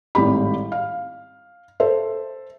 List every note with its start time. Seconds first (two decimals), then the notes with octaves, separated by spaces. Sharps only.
0.15 G#1 A2 G3 G4 B5
0.72 F5
1.80 A4 C5 E5